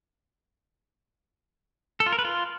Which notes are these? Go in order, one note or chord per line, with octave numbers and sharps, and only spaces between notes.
A4
F4
A#4
B4
F4